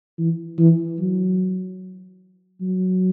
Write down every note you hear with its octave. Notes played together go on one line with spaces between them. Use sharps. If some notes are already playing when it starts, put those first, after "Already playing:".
E3
E3
F#3
F#3